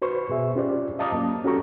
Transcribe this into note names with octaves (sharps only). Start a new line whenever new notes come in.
F#4 B4 C5 C#6
B2 G#4 E5
C#4 F4 G4 C5 D5
D#5 F5 A5 A#5 D6 D#6
F#3 A#3 C#4
C#4 F#4 G4 A4 A#5 C#6